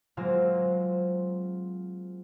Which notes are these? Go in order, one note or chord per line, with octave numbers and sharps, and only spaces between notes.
F#3 G#3 A#3 C4 F4 C5